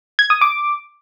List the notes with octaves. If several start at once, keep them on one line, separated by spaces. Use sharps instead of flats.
G#6
D#6
D6